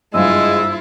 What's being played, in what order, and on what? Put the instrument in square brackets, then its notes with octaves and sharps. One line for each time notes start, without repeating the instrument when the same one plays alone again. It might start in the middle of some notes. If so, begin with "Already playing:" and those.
[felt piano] F#1 G2 F5 [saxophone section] G#3 [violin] E4 F4 [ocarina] E6